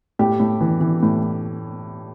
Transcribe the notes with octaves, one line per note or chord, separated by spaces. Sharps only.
A2 G4
A2
E3
E3
A2